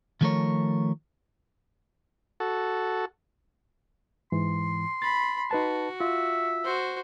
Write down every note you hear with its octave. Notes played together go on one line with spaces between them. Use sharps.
D#3 F3 A3 G#4 A#4 C#5
F#4 A4
G#2 E3 C6
B5 A6
D#4 F#4 B4 A5
F4 E5
F#4 C5